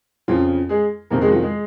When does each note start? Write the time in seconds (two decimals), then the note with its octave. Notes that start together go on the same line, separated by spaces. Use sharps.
0.28 F2 C#3 F3 F4
0.69 G#3 G#4
1.10 F2 C3 D#3 A#3 A#4
1.21 G#3 G#4
1.27 F#4
1.32 F3 F4
1.42 G#3 G#4